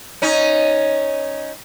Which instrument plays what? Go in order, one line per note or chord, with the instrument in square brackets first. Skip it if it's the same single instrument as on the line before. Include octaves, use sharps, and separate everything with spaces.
[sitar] C#4 D#4